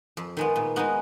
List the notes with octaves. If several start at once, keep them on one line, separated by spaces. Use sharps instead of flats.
F2
D#3 G#3 B3
A#2
G#3 B3 D#4 F#4